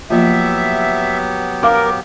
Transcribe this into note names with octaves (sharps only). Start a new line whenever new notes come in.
F3 F#3 A#3 B3 F4 G4 E5
A#4 F5 D6